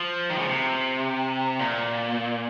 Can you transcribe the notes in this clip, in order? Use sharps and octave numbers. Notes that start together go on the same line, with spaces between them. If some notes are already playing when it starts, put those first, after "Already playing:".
Already playing: F3
D#3
C#3
C3
A#2